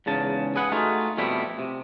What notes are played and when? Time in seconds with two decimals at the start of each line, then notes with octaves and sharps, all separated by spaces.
0.06 E2 G#2 C#3 A5
0.56 G#4 B4 F#5
0.72 A3 D#4 F4 F#4 G#4
1.17 F2 B2 G3 A3 B3 E4
1.59 C3